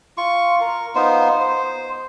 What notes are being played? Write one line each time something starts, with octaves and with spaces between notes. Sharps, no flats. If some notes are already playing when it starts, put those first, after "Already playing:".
F4 C#6
A#4
B3 D#4 F4 C5
C5